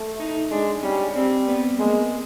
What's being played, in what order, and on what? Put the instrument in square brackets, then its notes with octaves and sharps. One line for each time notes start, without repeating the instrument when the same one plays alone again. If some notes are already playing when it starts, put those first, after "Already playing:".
Already playing: [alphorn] A3
[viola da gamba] D#4
[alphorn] G#3 [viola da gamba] D4
[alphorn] G3 [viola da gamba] C#4
[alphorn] G3 [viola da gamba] C4
[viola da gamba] B3
[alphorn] G#3 [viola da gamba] A#3